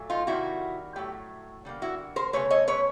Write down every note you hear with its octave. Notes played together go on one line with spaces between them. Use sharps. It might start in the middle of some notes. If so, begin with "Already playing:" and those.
Already playing: A#2 F#3 A3
D#4 F4
C3 D#3 G3 A#3 E4 F#4
A2 F#3 A3 G4
D3 G3 A#3
E4 F#4
A#4 C5
C#3 F3 A3 B4 C#5
C#5 D#5
B4 C#5